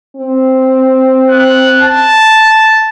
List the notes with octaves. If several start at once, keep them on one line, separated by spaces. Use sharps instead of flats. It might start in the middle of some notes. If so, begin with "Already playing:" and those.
C4
F#6
A5